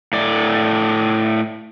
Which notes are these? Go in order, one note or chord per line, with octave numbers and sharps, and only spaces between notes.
A2 D5